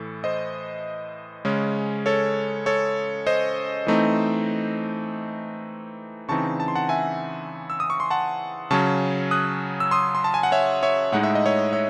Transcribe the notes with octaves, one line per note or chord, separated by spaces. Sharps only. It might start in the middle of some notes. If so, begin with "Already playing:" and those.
Already playing: A2 E3 A4
C5 D#5
C#3 G#3 C#4
A4 C#5
A4 C#5
C5 D#5
E3 A3 C4 D#4
C#3 E3 C4 D#4 A5 C#6
A5
C6
F#5 A5
E5 G#5
E6
D#6
C#6
C6
F#5 A5
C#3 F#3 C#4 A5 C#6
D#6 F#6
E6
C6 D#6
C6
A5
G#5
F#5
C#5 E5
C#5 E5
A2 G#3 D#4 F#5
E5
D#5
C#5 E5
C#5 E5